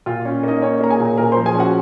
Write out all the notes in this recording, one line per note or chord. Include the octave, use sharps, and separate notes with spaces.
A#2 F4 F5
C#4
A#3 D#4 D#5
C#4 C#5
A#3 A#5
G#4 G#5
A#2
A#2 A#4 A#5
F3 C5 C6
G#4 G#5
C#4 F#4 F#5